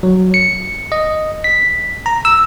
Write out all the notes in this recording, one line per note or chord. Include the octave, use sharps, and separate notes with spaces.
F#3
C#7
D#5
B6
A#5
E6